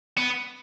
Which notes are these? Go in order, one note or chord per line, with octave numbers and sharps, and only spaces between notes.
B3